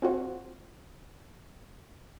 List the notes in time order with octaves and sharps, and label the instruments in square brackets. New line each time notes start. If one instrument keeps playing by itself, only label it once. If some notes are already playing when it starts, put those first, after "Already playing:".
[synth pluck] C4 F4 F#4 C5